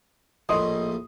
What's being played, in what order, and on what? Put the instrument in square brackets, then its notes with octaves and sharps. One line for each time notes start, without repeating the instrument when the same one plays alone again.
[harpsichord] A#1 A2 [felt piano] D#5 C6 D#6